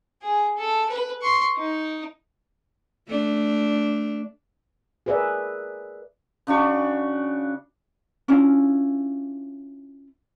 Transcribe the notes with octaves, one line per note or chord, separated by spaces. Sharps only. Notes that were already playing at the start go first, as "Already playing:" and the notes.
G#4
A4
B4
C6 C#6
D#4
A3 D4
G#4 A#4 B4 D5 E5
C#3 D4 F#4 C#6
C#4 D4 E4 F4